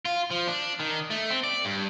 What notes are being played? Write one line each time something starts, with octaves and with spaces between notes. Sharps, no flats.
F4
F3
D4
D#3
A3
C4
D5
G2